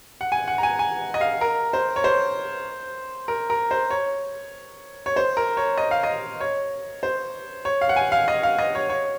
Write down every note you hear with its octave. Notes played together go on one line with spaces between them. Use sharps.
F#5
G#5
F#5
A#5
G#5
G#5
D#5
F5
A#4
C5
C#5
C5
A#4
A#4
C5
C#5
C#5
C5
A#4
C#5
D#5
F5
D#5
C#5
C5
C#5
F5
F#5
G#5
F5
D#5
F5
D#5
C#5
C#5